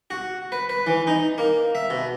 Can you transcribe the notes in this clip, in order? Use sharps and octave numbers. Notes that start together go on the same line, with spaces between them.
F#4
B4
B4
E3
D#4
A#3
E5
B2